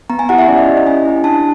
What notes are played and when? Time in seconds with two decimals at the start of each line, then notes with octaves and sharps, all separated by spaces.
0.10 B3 A#5
0.19 G#5
0.29 E4 G4 F#5
0.38 E5
0.48 C#4 D5
0.58 D#5
0.67 E4 G4
0.77 D#5
0.86 C#4 G#5
1.05 E4 G4
1.24 D4 A5